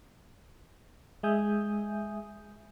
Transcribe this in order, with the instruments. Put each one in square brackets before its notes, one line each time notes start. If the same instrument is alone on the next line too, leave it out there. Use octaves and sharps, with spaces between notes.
[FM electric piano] G#3 E5 G#5 D#6 G6